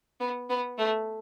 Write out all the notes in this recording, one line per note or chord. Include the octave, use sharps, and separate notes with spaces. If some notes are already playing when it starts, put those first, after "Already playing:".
B3
B3
A3